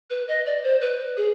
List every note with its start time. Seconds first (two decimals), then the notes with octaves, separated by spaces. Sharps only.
0.10 B4
0.28 D#5
0.46 D5
0.64 C5
0.81 B4
1.17 G#4